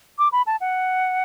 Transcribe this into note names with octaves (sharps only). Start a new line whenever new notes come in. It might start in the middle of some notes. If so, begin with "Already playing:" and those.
D6
B5
A5
F#5